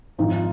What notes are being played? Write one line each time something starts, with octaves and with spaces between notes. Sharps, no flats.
G#1 G#2 F3 D#4
F4